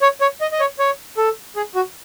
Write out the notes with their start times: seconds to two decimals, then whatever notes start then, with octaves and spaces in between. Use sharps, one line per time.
0.02 C#5
0.21 C#5
0.41 D#5
0.52 D#5
0.60 C#5
0.79 C#5
1.17 A4
1.56 G#4
1.75 F#4